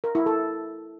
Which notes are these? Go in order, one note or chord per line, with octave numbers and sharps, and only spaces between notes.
A#4
E4
A4